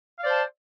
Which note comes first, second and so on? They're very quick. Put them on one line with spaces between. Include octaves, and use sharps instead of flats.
F5 D5 C5 A5